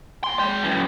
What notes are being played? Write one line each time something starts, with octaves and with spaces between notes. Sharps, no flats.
A#2 C6
G#3 G5
F#2 E3